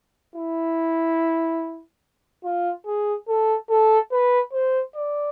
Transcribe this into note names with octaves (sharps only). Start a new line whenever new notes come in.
E4
F4
G#4
A4
A4
B4
C5
D5